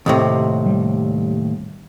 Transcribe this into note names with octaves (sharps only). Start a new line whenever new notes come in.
D#2 A2 C3
G3